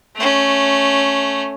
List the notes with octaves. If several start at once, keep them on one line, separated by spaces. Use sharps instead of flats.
A3 C#4